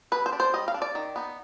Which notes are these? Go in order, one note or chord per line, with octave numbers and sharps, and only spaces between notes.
G3 B4
C5
D4
C5
G3 D#5
F5
D4
D5
D#3
B3 D#4